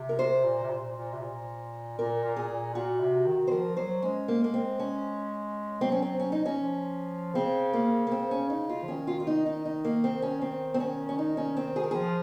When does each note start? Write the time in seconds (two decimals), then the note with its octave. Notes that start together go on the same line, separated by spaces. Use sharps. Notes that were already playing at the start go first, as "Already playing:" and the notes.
Already playing: C3
0.09 A#4
0.19 C5
0.45 A#2
0.63 C3
0.71 A#2
0.96 A#2
1.14 C3
1.21 A#2
1.97 A#2 A#4
2.24 A#2
2.36 G#4
2.49 A#2
2.74 A#2 F#4
3.01 C3
3.26 D#3
3.47 C5
3.51 F3 A#4
3.77 F#3 C5
4.02 G#3 C#4
4.28 A#3
4.44 A#3
4.54 C4
4.79 C#4
5.81 F#3 C4
5.92 C#4
6.02 C4
6.19 C#4
6.32 D#4
6.45 C#4
6.59 F3
7.34 C#3 C4
7.74 A#3
8.07 A#3
8.11 C4
8.31 C#4
8.50 D#4
8.69 F4
8.83 F3
8.88 D#3 C#4
9.07 F4
9.20 F4
9.27 D#4
9.46 D#4
9.65 D#4
9.85 A#3
10.04 C4
10.22 C#4
10.42 C4
10.74 C4
10.80 C#4
11.09 C#4
11.18 D#4
11.37 C#4
11.57 C4
11.76 G#4
11.83 A#4
11.91 F3 G#4